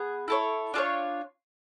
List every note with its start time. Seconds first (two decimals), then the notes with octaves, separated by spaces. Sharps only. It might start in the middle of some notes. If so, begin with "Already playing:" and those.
Already playing: B3 G#4
0.28 E4 A4 C#5
0.74 D4 F4 A4 C#5